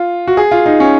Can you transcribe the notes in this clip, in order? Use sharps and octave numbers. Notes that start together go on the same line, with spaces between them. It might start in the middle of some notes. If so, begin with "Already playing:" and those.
Already playing: F4
F#4
G#4
F4
D#4
C#4